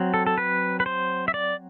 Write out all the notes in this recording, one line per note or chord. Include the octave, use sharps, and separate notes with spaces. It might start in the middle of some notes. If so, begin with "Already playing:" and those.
Already playing: F#3 C4
A4
A4
B4
B4
C5
E5
D5